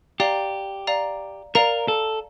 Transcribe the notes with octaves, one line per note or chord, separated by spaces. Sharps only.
G4 D5 F5 A#5
D5 F5 A#5
A#4 D5 F5 A#5
A4